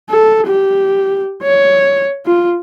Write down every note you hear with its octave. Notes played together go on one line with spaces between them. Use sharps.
A4
G4
C#5
F4